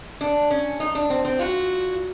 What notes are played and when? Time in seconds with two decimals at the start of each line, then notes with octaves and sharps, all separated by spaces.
0.21 D4
0.51 C#4
0.80 D#4
0.95 D4
1.10 C4
1.25 C4
1.39 F4 F#4